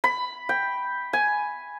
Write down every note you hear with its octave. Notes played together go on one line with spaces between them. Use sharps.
B5
G5
G#5